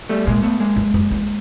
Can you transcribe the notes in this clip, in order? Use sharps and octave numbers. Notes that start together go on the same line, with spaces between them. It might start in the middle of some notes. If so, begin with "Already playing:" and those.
G3 A3
A#2 G#3 A#3
A3 B3
G#3 A#3
G2
F#2
E2